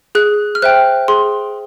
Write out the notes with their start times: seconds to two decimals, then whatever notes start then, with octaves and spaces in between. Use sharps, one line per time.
0.15 G#4 F#6
0.55 F6
0.62 C5 E5 G5 F#6
1.08 G#4 C6